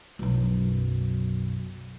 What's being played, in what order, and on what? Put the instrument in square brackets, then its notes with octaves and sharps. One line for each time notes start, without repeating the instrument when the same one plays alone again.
[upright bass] B1 F#2